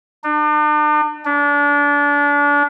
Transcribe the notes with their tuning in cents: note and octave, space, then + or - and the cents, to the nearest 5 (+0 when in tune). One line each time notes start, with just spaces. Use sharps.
D4 +40
D4 -30